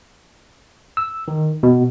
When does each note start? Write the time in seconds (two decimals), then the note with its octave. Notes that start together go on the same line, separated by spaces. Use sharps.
0.97 E6
1.28 D#3
1.63 B2